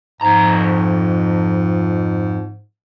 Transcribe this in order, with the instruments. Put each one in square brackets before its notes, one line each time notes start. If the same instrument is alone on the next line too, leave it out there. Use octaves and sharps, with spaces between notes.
[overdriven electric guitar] F2 A#5 [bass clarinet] G#2